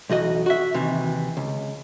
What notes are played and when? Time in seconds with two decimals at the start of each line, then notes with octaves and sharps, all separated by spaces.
0.09 B1 E2 F#4 D#5
0.46 F#4 E5
0.74 D#2 C3 E3
1.37 C#2